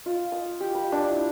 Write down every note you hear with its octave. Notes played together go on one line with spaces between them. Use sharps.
F4
D#6
G4
B5
D4
E4